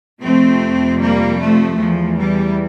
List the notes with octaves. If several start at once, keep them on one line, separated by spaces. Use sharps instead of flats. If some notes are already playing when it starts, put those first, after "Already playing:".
F2 C3 F3 A3 C4
G3 A#3
F3 A3
E2 E3 F3
G3